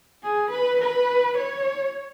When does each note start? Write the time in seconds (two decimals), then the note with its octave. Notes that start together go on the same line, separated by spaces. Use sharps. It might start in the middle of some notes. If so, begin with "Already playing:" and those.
0.23 G#4
0.51 B4
0.81 B4
1.38 C#5